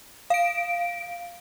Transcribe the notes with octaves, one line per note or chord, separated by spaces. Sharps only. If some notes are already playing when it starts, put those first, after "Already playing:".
F5 D7